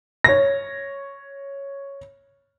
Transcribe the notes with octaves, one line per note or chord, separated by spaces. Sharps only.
C#5 A#6